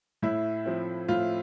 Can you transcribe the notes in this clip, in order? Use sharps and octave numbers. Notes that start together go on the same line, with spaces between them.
A2 E4
F3 C4
A2 F4